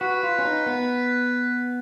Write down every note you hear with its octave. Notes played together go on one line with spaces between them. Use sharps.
F#4 B4
F4
C#4
D#4
B3